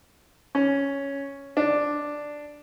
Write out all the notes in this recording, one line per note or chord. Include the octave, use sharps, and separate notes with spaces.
C#4
D4